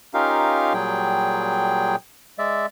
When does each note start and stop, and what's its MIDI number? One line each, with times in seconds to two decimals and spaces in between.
0.14 0.73 61
0.14 0.73 63
0.14 0.73 65
0.14 0.73 67
0.14 0.73 70
0.14 0.73 77
0.74 1.96 46
0.74 1.96 54
0.74 1.96 55
0.74 1.96 68
0.74 1.96 79
2.39 2.66 56
2.39 2.66 74
2.39 2.66 76